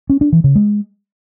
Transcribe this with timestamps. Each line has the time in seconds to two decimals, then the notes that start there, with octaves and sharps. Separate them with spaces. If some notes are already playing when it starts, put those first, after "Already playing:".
0.10 C#4
0.21 D4
0.33 E3
0.44 C#3
0.56 G#3